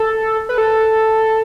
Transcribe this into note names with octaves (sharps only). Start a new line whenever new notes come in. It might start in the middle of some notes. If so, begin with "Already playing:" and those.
Already playing: A4
B4
A4